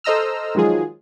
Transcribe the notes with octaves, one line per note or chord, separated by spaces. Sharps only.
A4 C5 D#5 A#5 E6 F6
D#3 F3 F#3 G#3 F4 G#4